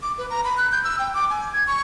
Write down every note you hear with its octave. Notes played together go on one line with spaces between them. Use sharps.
D6
B4
A#5
B5
F#6
G6
E6
G5
D6
G#5
G#6
C#6